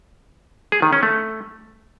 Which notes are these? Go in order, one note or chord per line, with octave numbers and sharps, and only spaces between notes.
G#4
D#3
C#4
A3